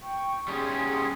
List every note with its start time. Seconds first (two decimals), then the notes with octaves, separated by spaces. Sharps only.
0.02 G5 C#6
0.48 G3 C#4 G#4 C6 D#6